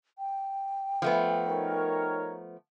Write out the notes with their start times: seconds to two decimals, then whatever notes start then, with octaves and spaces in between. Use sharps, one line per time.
0.19 G5
1.02 F3 A3 B3
1.47 D#4 A#4 C#5